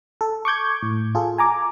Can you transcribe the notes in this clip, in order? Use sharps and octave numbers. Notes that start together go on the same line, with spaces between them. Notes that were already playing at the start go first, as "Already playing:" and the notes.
A4
C#6 D6 G6 G#6
A2
F4 G#4 A4
G#5 A#5 D6